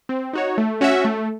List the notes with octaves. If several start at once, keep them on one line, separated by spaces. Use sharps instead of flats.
C4
D#4 F#4 C#5
A3
C#4 F#4 C#5 E5
A3